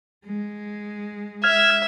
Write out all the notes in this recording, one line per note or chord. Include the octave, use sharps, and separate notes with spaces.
G#3
E5 F6 G#6